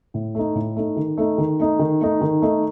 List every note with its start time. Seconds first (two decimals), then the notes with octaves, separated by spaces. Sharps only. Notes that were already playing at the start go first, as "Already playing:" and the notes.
0.14 A2
0.35 A3 D#4
0.55 A2
0.76 A3 D#4
0.96 D#3
1.17 A3 D#4
1.38 D#3
1.59 A3 D#4
1.79 D#3
2.01 A3 D#4
2.21 D#3
2.42 A3 D#4